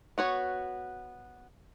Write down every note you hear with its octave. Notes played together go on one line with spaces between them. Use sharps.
B3 F#4 C#5